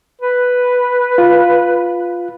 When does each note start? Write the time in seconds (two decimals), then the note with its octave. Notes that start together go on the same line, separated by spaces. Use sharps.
0.21 B4
1.18 F4